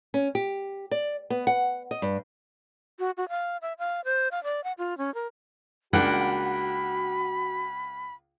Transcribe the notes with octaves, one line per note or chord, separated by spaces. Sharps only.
C#4
G4
D5
B3
F#5
D#5
G2
F#4
F#4
F5
E5
F5
C5
F5
D5
F#5
F4
C#4
A#4
C#2 A#3 D4 F#4 F#5 G5 B5